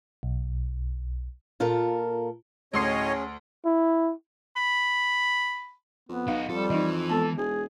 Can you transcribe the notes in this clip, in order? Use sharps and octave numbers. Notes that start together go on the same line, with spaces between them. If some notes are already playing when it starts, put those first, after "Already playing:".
B1
A#2 F4 A4 A#4
D2 A2 C#4 G#4 C#5 D#5 C6 C7
E4
B5
F2 B3
B1 D#4 F#4 F5 F#5
F2 G3 A4
E3 D#4 D#5
G#3 B3 A4 A5
E1 G#4